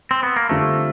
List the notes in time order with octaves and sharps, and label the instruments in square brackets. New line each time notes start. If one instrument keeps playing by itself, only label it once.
[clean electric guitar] C4
B3
A#3
[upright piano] D3 G3 C4 F4 [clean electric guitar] A3